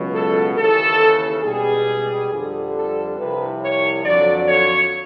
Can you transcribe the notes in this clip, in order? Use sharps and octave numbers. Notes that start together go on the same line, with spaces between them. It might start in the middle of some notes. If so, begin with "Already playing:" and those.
Already playing: C#2 B2 F#3
A4
D#2 C#3 E3 A4
C#2 B2 G3 G#4
F2 D3 G3
A4
C2 C3 F3 B4
C#5
F2 D3 F#3 D5
C#5